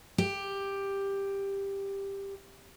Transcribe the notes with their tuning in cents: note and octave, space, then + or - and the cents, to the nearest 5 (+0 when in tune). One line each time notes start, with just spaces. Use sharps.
G4 +10